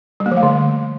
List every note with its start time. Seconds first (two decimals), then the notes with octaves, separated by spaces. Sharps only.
0.20 G3
0.26 A#3
0.31 F3
0.37 A3
0.43 D3